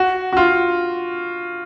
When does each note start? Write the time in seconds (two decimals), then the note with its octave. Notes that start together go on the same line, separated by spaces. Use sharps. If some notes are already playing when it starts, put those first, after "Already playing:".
Already playing: F#4
0.33 F#4
0.37 F4